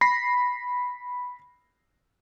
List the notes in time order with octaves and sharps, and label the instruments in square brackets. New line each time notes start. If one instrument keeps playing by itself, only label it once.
[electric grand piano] B5 A#6 C7